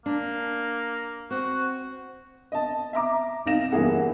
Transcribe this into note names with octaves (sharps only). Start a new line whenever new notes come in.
A#3 D4
C4 F#4
D#5 A5
E5 A#5 D6
C2 D#4 F5 A#6 E7
G1 G2 E3 A#3 G#4 F#5